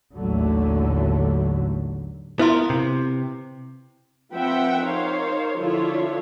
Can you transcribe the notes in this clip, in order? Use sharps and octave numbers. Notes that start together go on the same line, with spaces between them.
A1 D#2 D3 F#3 A3
B3 E4 F4 A#4 B4 C6
C3
F3 C4 B4 E5 F#5 G5
D#4 A#4 C5 C#5 F5
D3 F3 D4 E4 F4 C#5